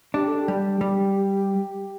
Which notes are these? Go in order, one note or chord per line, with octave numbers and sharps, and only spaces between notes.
D4 G4
A4
G4
G3
G3